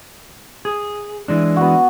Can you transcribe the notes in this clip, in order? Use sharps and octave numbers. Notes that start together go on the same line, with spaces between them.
G#4
E3 G#3 D4
B3 F#4